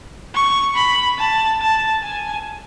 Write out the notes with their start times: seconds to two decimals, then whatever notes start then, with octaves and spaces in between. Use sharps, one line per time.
0.34 C#6
0.76 B5
1.18 A5
1.60 A5
2.02 G#5